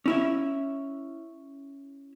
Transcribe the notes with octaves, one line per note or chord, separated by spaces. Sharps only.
C#4 E4 E5